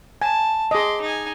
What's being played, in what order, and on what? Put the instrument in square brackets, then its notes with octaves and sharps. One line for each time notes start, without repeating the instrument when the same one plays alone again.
[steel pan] G#5 [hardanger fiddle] A5
[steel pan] G#4 D#5 [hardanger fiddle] C6 D6
[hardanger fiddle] D#4 G#5